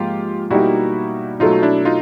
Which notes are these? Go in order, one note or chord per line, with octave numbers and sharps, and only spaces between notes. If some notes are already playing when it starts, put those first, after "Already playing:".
Already playing: G#2 F3 A#3 F4 G4
B2 G3 A#3 D#4 E4 F#4 G4
B2 F#3 A3 D#4 F4
D4 E4
D#4 F4